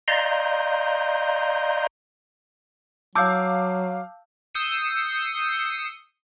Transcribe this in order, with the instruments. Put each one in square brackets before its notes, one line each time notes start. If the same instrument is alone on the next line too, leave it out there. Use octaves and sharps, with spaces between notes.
[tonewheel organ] D5 D#5 F5 A#5 C6 G6
[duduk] F#3 [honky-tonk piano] F5 D6 [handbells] A5 E6 G6
[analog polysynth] D#6 E6 G6 C7 C#7 D#7